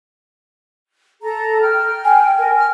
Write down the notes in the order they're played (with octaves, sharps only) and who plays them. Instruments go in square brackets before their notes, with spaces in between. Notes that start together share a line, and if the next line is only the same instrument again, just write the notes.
[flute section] A4 A#5
G5 F6
[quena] G#5
[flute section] A#4
F6